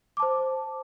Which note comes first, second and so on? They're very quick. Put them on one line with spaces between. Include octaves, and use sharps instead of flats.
D6 A5 C5